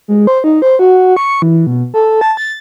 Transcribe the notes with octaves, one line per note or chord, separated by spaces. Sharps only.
G#3
C5
D#4
C5
F#4
C#6
E3
B2
A4
A5
A6